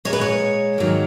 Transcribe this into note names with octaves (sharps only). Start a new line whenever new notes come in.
A#2 G#3 C#5
B4
C#5
G#2 D#3 F#3 A#3